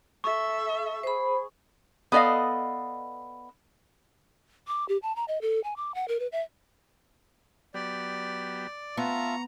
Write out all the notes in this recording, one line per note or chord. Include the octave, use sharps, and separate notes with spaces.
A4 E5 C#6
G#4 C5 B5
B3 A4 D5 D#5 F5
D6
G4
A5
A#5
D#5
A4
G#5
D6
F#5
A#4
B4
E5
F#3 B3 G4 D5
B3 F4 E5 A5 A#5 C#6